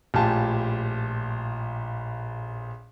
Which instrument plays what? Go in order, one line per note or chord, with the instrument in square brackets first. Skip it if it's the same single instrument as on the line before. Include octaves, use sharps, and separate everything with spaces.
[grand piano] A#1 A2 F4 G4 G#5 A5